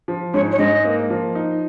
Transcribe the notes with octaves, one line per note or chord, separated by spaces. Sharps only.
F3
G#2 C#5
C#5
G#2 D#5
A#3
F3
D#4